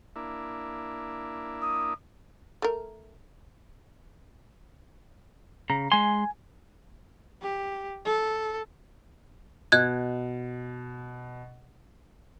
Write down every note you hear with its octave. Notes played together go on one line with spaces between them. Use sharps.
A#3 D4 E4
D#6
A3 A#4
C#3 A#5
G#3 G#5 C6
G4
A4
B2 D#5 F#6 G#6